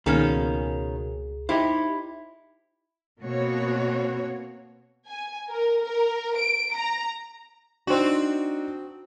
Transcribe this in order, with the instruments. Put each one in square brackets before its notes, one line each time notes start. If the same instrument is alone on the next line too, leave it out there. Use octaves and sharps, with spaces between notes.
[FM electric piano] C#2 G#4 [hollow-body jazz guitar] B2 A#3 [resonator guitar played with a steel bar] D#3 C#4
[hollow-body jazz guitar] D#4 G4 C5 [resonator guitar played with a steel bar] E4
[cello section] B2 A#3 C4 F#4 C#5
[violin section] G#5
A#4
A#4
D7
A#5
[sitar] C4 F#4 [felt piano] D4 D#4